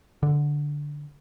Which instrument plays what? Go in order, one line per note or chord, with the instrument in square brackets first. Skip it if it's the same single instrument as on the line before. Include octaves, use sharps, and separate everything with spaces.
[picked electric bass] D3